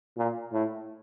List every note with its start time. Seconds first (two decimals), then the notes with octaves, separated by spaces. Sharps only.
0.17 A#2
0.52 A2